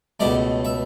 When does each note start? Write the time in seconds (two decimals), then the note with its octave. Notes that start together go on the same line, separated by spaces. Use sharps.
0.20 C#2 B2 A3 D5
0.65 E5